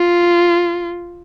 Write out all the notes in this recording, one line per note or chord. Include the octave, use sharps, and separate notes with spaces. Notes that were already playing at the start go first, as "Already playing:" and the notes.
Already playing: F4